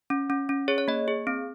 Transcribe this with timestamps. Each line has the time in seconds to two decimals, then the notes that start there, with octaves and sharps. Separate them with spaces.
0.10 C#4
0.30 C#4
0.49 C#4
0.68 G#4 C#5
0.78 C#5
0.88 A#3 D#5
1.08 G#4
1.27 C4